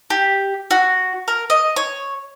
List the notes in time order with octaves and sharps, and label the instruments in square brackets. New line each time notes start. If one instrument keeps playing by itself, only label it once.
[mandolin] G4
F#4
A#4
D#5
C#5